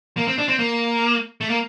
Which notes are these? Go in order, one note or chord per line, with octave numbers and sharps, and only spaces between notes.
A#3
C4
D4
C4
A#3
A3
A#3